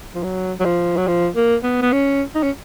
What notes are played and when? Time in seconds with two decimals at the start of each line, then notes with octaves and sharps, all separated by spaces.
0.15 F3
0.23 F#3
0.60 F#3
0.65 F3
0.97 F#3
1.08 F3
1.36 A#3
1.64 B3
1.82 B3
1.93 C#4
2.35 D#4
2.43 C#4